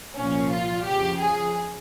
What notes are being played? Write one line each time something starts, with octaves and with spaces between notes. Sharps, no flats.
C2 A#2 F3 C#4
F4
F2 C#3 F3 G4
G#4